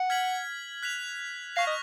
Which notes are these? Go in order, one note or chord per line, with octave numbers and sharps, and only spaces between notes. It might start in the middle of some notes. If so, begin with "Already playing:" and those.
Already playing: F#5
F6 G#6 B6 F#7
F#6 B6 F7
F5 C#6 F6 A#6 F7
D#5